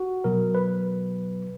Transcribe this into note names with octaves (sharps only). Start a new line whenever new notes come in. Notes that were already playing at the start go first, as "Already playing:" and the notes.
Already playing: F#4
B2 F#3 A#4
B4